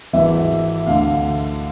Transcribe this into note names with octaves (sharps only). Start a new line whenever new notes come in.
G#1 G#2 E3 E5
D2 D3 F5